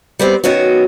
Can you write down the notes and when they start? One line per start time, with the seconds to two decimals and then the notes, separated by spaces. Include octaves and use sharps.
0.19 G3 B3 C4
0.44 D#3 B3 C#4 F#4